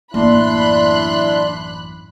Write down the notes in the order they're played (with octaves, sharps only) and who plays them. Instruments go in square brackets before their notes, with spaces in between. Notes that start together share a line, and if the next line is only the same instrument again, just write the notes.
[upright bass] A1 A#3 [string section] F#2 B5 F#6 [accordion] D4 C6 [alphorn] E4